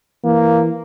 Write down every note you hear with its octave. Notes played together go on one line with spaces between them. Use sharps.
E3 A#3